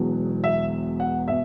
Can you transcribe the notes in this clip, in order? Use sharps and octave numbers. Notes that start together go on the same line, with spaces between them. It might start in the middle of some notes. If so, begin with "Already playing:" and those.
Already playing: E1 E2 B2 F#3
E5
F#5
B2 E5